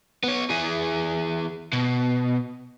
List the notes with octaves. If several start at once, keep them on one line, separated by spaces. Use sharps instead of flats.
B3 C#5
E3 G#4
B2